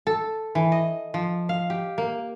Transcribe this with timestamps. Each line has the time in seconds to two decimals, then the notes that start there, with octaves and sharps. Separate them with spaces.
0.07 A4
0.55 E3
0.72 D#5
1.14 F3
1.49 F5
1.70 G4
1.98 A#3